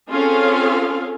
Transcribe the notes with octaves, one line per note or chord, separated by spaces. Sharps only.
C4 C#4 F4 G#4 A4 F5